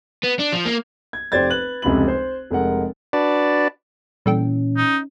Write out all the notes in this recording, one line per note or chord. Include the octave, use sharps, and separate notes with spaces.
B3
D4
F3
A#3
G#6
F1 G4 C5 D5 G#6 A6
B4 F#6 F#7
F1 C#2 C3 B5 F#7
C5
F1 G#3 A#4 F#5
D4 F#4 B4 D5 A5
A#2 E3 G3 C#4 A4 G5
D#4